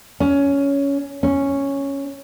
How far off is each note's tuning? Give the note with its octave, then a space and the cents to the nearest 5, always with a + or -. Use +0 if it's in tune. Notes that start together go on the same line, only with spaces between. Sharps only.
C#4 +15
C#4 +0